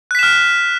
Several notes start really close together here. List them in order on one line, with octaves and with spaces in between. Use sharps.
F#6 B6 E7 F6